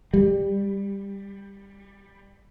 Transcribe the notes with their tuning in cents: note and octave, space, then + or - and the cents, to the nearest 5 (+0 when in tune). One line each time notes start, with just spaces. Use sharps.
G3 +15